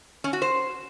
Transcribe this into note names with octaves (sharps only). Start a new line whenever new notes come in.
C#4
F#4
C5